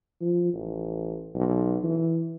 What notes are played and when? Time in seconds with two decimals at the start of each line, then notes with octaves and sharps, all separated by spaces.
0.21 F3
0.54 A1
1.35 B1
1.84 E3